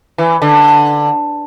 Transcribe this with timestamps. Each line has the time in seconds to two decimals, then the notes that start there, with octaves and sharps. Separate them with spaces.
0.18 E3
0.42 D3